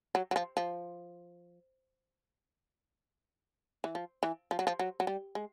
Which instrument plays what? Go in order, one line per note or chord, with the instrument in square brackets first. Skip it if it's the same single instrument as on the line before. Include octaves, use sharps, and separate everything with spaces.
[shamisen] F#3
F#3
F3
F3
E3
F3
E3
F3
F#3
F3
F#3
F#3
G3
G#3